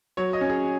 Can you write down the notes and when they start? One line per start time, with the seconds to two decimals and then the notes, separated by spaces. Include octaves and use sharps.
0.17 F#3 C#5
0.33 D#5
0.41 C#4
0.49 G#4